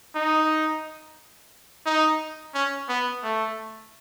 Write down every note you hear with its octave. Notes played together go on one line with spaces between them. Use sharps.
D#4
D#4
C#4
B3
A3